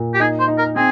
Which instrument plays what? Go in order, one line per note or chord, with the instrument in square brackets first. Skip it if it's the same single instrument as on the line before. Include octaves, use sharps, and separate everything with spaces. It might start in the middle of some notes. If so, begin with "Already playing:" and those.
Already playing: [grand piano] A#2
[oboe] G4
[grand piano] D#4 [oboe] G#4
[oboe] C5
[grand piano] D#4
[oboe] A#4
[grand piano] C4 [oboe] G#4